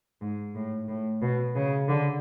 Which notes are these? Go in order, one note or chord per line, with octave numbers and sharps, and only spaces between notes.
G#2
A2
A2
B2
C#3
D3